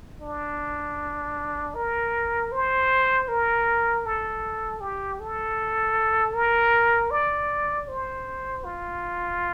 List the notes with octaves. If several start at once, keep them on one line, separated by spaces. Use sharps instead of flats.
D4
A#4
C5
A#4
A4
G4
A4
A#4
D5
C5
F4